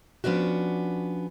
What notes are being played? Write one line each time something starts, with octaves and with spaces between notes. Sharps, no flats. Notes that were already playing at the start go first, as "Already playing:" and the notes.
F3 B3 C#4 D4 F#4